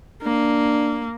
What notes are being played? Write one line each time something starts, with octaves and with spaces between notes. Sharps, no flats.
A#3 D4